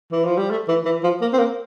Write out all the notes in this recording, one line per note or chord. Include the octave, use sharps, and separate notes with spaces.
E3
F3
G3
A3
E3
E3
F3
A#3
C4
A#3